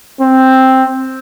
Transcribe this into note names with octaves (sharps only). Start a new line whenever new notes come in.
C4